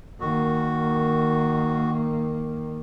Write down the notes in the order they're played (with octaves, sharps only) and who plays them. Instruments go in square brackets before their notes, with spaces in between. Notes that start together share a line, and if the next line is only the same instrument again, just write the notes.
[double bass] D#3 A#3 [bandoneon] F#4